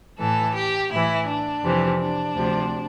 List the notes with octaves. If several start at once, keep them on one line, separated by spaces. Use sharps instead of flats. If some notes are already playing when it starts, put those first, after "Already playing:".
A2 E3 A4
G4
A2 E3 E4
D4
F2 C3 E3
D4
D2 C3 F3